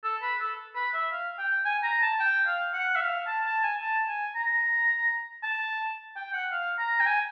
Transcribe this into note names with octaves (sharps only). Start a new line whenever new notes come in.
A4
B4
A4
B4
E5
F5
G5
G#5
A#5
A5
G5
F5
F#5
E5
F5
A5
A5
G#5
A5
G#5
A#5
A5
G5
F#5
F5
A#5
G5
G#5